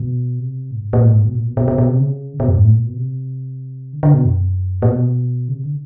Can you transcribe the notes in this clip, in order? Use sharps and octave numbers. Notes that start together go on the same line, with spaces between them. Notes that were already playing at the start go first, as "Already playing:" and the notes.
Already playing: B2
C3
A2
G2
G#2
A#2
A2
G#2
B2
A#2
B2
B2
B2
B2
C3
C#3
B2
F#2
G#2
A2
A#2
B2
C3
D3
D3
B2
F#2
A#2
B2
C#3
C3
D3